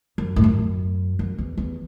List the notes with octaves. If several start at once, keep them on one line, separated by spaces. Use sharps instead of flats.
F#2
A2
F#2
F#2
E2
E2